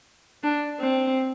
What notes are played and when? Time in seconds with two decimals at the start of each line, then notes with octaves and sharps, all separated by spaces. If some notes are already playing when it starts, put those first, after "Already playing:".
0.43 D4
0.80 C4